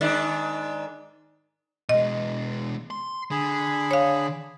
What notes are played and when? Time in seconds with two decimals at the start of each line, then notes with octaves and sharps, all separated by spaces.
0.01 G#2 D#3 D4
1.89 B2 G#3 D#5
2.91 C6
3.31 D3 G#4 B5
3.91 C#5 F5